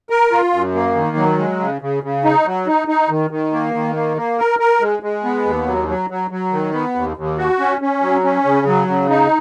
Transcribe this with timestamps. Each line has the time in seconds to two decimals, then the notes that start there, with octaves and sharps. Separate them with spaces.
0.10 A#4
0.32 F4
0.53 F#2
0.75 A#3
0.96 D#3
1.17 F#3
1.38 G#3
1.60 C#3
1.81 C#3
2.03 C#3
2.24 D#4
2.46 F#3
2.67 D#4
2.88 D#4
3.09 D#3
3.31 D#3
3.53 A#3
3.74 D#3
3.95 A#3
4.17 A#3
4.38 A#4
4.59 A#4
4.81 G#3
5.03 G#3
5.24 B3
5.45 D#2
5.66 F#3
5.88 F#3
6.10 F#3
6.31 F#3
6.52 D#3
6.73 B3
6.95 D#2
7.17 D#2
7.38 F#4
7.60 C#4
7.81 C#4
8.02 F#3
8.24 C#4
8.45 C#3
8.67 F#3
8.88 C#3
9.10 D#4